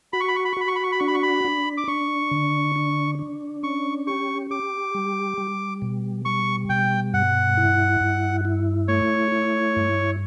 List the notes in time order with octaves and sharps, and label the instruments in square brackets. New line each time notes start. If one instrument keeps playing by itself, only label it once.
[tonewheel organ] F#4 [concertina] B5
[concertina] C#6
B5
C#6
B5
C#6
[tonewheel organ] F#4 [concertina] B5
[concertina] C#6
B5
C#6
B5
[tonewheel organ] D4 [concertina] C#6
[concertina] B5
C#6
B5
[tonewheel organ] D4
[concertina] D6
[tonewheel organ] D4 [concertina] C#6
[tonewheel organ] D3
D4
D4
[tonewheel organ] C#4 [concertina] C#6
[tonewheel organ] G4 [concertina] C#6
[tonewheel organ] G4 [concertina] D6
[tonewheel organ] G3
G3
B2
[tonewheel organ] G3 [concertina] C#6
[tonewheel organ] B2 [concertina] G5
[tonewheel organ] G2 [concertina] F#5
[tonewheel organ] E4
G2
E4
[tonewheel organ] A3 [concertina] C#5
[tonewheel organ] E4
G2